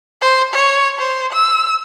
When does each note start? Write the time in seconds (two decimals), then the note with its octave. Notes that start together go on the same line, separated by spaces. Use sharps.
0.21 C5
0.53 C#5
0.98 C5
1.32 E6